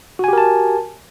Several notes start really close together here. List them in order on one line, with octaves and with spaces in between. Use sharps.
F#4 G#5 G4 A#4 A5